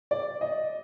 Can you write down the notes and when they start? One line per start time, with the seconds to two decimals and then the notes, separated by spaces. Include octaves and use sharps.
0.11 D5
0.41 D#5